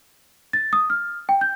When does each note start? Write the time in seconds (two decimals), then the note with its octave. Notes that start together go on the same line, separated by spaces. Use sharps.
0.53 A6
0.73 D#6
0.90 F6
1.29 G5
1.41 G6